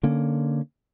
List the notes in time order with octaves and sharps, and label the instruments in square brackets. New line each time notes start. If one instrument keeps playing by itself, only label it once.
[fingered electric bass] D3 A#3 C#4